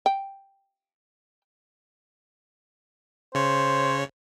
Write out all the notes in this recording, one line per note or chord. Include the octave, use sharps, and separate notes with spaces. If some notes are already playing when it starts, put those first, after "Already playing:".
G5
C#3 C5 C#5